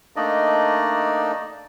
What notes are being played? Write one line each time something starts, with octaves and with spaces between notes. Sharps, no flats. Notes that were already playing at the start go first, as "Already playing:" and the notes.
A3 A#3 D4 D#4 D5 D#5